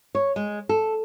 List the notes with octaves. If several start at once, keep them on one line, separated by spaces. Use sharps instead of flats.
C#5
G#3
A4